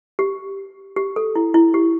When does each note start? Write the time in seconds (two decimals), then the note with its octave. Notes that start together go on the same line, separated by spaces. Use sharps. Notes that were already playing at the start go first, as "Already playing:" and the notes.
0.19 G4
0.96 G4
1.16 A4
1.35 E4
1.54 E4
1.74 G4